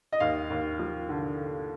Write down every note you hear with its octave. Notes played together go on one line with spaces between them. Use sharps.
D#5
D#2 F5
D#2
F3
D3